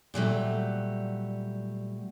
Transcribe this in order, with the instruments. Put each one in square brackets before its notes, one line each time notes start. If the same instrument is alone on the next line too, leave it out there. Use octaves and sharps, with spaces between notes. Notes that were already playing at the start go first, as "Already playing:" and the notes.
[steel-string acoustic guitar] A#2 F#3 G3 A3